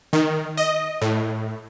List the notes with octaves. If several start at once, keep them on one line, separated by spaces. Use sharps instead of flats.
D#3
D#5
A2